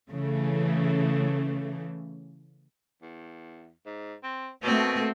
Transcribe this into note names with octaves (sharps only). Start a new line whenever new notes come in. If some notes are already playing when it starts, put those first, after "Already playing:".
C#3 E3 A3
E2
G#2
C4
B2 A3 A#3 C4 F#4